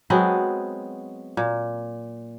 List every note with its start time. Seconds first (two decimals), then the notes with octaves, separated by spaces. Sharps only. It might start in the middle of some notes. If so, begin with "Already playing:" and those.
0.10 F#3 G#3 B3 C4
1.37 A#2